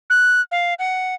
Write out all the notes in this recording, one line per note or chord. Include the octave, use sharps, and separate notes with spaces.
F#6
F5
F#5